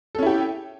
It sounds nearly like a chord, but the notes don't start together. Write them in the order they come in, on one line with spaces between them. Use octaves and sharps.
A4 C#4 E4 G4